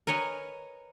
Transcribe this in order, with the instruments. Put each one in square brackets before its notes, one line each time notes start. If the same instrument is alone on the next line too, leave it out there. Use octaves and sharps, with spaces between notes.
[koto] A#4 B4 C#5 D#5 G#5